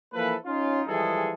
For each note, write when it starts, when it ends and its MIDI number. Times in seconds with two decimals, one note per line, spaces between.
0.13 0.34 52
0.13 0.34 53
0.13 0.34 58
0.13 0.34 69
0.13 0.34 71
0.46 0.82 61
0.46 0.82 63
0.46 0.82 65
0.88 1.33 52
0.88 1.33 53
0.88 1.33 55
0.88 1.33 56
0.88 1.33 68
0.88 1.33 69